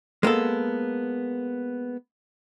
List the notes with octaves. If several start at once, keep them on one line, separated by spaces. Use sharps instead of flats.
G#3 A#3 B3 A4